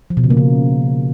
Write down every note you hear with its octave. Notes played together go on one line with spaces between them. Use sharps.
F3
B2
C#3
A#3
C#3